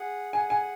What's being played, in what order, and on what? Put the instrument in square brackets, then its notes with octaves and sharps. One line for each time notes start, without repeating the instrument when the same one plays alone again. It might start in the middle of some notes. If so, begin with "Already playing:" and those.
Already playing: [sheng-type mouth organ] G#4 F#5
[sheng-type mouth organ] G#4 F#5 [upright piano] G#5
[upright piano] G#5